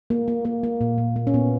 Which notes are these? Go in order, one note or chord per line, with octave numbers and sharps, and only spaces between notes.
A#3
A#3
A#3
A#3
A#2
A#2
A#3
C#4
A#2 B3